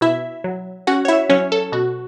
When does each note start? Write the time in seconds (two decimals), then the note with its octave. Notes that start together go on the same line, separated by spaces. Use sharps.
0.01 B2 E4 E5
0.44 F#3
0.87 C#4 F#4 F#5
1.05 C#5
1.08 E4 E5
1.29 F#3 C#4 C#5
1.52 A4
1.72 B2 F#4